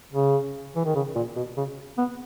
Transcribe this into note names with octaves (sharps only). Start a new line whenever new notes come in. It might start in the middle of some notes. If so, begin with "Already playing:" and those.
C#3
E3
D#3
C#3
A#2
B2
C#3
B3